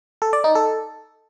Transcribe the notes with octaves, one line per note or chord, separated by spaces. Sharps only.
A4
D5
D#4
A4